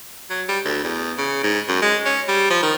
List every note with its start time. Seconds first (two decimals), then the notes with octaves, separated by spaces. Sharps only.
0.30 F#3
0.48 G3
0.65 D2
0.83 E2
1.18 C#3
1.43 G#2
1.68 F#2
1.82 G#3
2.06 C#4
2.28 G3
2.50 F3
2.62 D#3